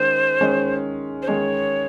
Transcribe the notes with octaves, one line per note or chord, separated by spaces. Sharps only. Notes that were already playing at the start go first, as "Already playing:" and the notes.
Already playing: D#3 G#3 C#4 C5
D#3 G#3 C#4
C5
D#3 G#3 C#4 C#5